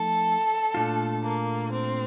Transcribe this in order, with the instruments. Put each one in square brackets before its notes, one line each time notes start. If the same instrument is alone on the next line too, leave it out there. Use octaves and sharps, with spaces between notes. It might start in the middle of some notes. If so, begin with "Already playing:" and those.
Already playing: [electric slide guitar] F3 A3 D#4 [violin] A4
[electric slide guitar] A#2 A3 D4 F4
[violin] A#3
C4